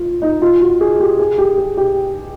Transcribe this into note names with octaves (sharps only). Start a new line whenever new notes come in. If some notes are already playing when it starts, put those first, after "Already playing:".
Already playing: F4
D#4
F4
F#4
G#4
G4
G#4
G4
G#4
G4